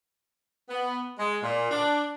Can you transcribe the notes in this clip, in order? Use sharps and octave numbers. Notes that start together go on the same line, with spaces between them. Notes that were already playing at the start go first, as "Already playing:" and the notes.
B3
G#3
A#2
D4